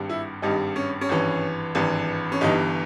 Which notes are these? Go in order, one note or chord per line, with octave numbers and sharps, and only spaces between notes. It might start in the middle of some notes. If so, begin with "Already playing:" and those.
Already playing: G#1 G2 G3
E4
G#1 G2 G3 D#4
C#4
C#4
G#1 G2 E3
G#1 G2 E3
C#4
G1 G2 E3 D#4